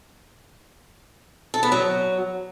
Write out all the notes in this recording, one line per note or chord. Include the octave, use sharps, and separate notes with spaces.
A4
B3
F#3